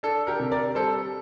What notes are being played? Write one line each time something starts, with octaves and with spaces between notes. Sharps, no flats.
D4 A4
G4 A#4
C3
A#4 D5
G3 A4 C5